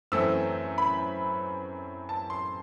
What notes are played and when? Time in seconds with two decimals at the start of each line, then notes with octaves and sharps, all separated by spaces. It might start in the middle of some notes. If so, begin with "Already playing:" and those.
0.12 F#2 E3 A3 C4 E6
0.78 B5
2.09 A5
2.30 C6